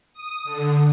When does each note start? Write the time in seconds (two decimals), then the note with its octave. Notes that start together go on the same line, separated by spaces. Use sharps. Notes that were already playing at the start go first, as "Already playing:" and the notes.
0.13 D#6
0.44 D3